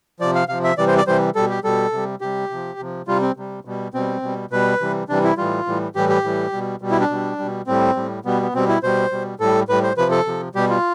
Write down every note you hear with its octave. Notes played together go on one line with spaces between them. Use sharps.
C3 F3 D5
F5
C3 F3 F5
E5
C3 E3 G3 D5
C5
D5
C3 E3 G3 C5
B2 G3 A4
G4
B2 G3 A4
C3 G3
C3 G3 G4
C3 F3
C3 F3
C3 G3 F4
C4
C3 G3
B2 G3
B2 G3 C4
B2 G3
B2 G3 B4
C3 E3 G3
C3 E3 G3 D4
E4
A2 E3 G3 F4
A2 E3 G3
A2 E3 G3 G4
G4
A2 E3 G3
B2 G3
B2 G3
E4
D4
B2 G3
B2 G3
A2 G3 C4
A2 G3
B2 G3 B3
B3
B2 G3 C4
E4
B2 G3 C5
B2 G3
A2 G3 A4
A2 G3 B4
C5
C3 F3 B4
A4
C3 F3
B2 G3 G4
F4